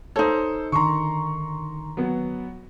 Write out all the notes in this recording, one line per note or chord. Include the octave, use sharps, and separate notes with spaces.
D#4 A4 C5 C#5
D3 D#3 A#5 C6 C#6
F#3 B3